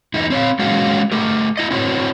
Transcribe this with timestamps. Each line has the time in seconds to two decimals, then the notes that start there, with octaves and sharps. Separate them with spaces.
0.14 E2 D#4 E4
0.30 C4 C#5 F5
0.59 G#3 A#3 C#4 F#4 F5
1.12 A3 G4 A#4
1.57 E4 D#5
1.70 C4 E4 F#4 C5 C#5